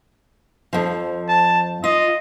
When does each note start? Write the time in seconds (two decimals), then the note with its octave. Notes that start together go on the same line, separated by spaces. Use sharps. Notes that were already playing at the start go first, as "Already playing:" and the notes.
0.73 F2 F3
1.29 A5
1.84 F4 D#5